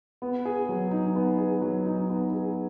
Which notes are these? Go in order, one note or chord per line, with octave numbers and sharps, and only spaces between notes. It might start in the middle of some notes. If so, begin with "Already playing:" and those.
B3
G#4
F#3
D#4
B3
G#4
F#3
D#4
B3
G#4